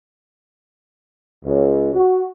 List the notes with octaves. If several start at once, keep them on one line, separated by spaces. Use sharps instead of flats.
C#2
F#4